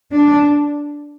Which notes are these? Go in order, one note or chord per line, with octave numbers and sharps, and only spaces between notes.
D4